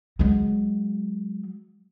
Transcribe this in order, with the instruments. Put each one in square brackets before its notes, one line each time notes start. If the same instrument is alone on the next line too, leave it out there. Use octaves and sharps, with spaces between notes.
[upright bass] F#3 G#3